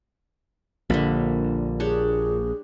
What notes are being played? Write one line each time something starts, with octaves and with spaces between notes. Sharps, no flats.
A#1 A#2 D3 G3 B5
D4 G4 G#4 C#5